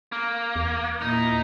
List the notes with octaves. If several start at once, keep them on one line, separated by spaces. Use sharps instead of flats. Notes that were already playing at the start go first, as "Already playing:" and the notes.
A#3
E2
A#2 D#4 E4